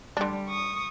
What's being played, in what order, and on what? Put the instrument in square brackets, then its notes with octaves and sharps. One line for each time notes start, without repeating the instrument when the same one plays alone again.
[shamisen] D3 D4 [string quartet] G3
[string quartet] C#6 D#6